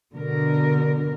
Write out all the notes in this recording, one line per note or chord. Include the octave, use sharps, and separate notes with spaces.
B2 D3 A#4